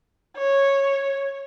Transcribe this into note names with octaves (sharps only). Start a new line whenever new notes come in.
C#5